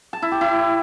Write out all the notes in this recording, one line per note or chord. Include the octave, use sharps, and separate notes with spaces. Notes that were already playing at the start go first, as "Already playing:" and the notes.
A5
E4
G4
E4